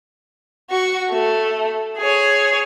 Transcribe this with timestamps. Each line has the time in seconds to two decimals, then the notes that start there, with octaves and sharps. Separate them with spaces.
0.70 F#4 C#6
1.11 A3
1.98 G#4 C#5